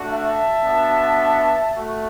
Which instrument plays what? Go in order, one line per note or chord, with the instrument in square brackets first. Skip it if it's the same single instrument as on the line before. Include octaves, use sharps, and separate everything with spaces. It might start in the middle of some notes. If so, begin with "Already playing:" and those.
Already playing: [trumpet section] A3 D4 F#4
E5 A5
B3 D4 F#4
A3 F#4